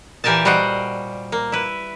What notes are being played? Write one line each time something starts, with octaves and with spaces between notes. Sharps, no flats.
A#2 E3 G4 A#4 G#5 A5
G3 F#4 C5 D#5 F#5
A#3
E4 B4